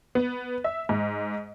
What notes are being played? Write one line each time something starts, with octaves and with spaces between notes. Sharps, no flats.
B3
E5
G#2